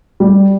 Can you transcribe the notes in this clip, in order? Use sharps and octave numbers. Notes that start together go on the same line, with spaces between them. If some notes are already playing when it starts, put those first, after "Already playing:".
G3